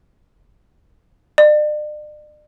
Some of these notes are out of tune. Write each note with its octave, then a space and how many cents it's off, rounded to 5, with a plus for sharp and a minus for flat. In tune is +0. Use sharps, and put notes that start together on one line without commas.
D5 +40